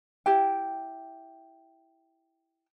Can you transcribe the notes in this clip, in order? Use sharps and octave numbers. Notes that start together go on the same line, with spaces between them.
E4 G4 G5